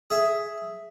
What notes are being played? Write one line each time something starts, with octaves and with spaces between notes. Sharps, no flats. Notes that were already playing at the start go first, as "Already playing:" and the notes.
G#4 E5